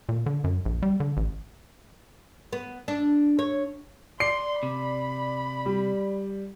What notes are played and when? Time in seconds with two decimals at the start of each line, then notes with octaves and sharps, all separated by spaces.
0.09 A#2
0.26 D3
0.44 F#2
0.65 A#1
0.82 G3
1.00 D3
1.17 A1
2.53 B3
2.88 D4
3.39 C#5
4.20 D5 C6 C7
4.63 C3 B5
5.66 G3